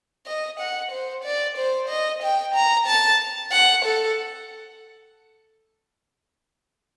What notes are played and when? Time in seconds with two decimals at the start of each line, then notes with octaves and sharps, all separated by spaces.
0.26 D#5
0.59 F#5
0.91 C5
1.24 D5
1.57 C5
1.89 D#5
2.22 G5
2.54 A#5
2.87 A5
3.52 F#5
3.85 A4